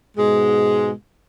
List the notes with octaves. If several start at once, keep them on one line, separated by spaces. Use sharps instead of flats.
G#2 B2 G#3